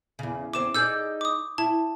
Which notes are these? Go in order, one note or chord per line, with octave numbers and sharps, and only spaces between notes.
E2 C#3
E2 C#3 C4 D6 E7
D#4 G#4 D5 E6 G6
D6 D#6
E4 A5